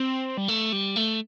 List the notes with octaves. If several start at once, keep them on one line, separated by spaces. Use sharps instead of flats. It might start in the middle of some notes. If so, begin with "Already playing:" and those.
Already playing: C4
G3
A3
G3
A3